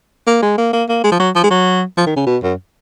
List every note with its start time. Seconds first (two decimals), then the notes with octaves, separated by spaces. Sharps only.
0.27 A#3
0.42 G#3
0.58 A#3
0.73 A#3
0.89 A#3
1.04 G#3
1.12 F3
1.20 F#3
1.35 F3
1.43 G#3
1.51 F#3
1.97 F3
2.07 D#3
2.16 C#3
2.27 B2
2.43 F#2